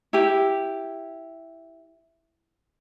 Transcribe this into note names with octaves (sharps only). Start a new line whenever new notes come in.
E4 G4